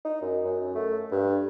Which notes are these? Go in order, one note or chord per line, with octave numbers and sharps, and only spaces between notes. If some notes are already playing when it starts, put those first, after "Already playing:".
D#4
F#2
F#2
A3
G2